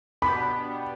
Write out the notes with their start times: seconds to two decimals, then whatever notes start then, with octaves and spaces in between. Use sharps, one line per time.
0.22 B2 B3 D4 G4 B5